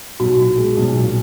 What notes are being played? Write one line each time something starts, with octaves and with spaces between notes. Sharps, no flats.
B1 F#4
A#2
G#3
B1
A#2